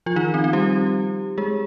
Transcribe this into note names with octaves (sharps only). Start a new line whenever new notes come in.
F3 F4
D#3 D#4
C4
C4
G3 G4
G#3 G#4